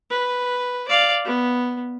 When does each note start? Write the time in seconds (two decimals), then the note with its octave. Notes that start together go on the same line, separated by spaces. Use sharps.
0.10 B4
0.88 D5 F5
1.25 B3